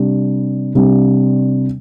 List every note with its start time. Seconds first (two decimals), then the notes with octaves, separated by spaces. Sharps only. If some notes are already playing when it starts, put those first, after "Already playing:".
Already playing: C3 G3 D4
0.75 C3 G3 D4